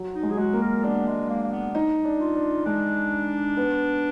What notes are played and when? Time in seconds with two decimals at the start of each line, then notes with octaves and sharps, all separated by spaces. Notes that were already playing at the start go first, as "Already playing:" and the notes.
Already playing: F#3
0.15 D#4
0.23 G#3
0.30 F#3 G#4
0.37 G#3 F#4
0.53 A#3
0.61 A#4
0.83 B3 D4
1.07 G#3
1.29 A#3
1.43 A#3
1.52 B3
1.75 D#4
2.05 D4
2.20 F4
2.36 D4
2.66 G#3 D4
3.57 B3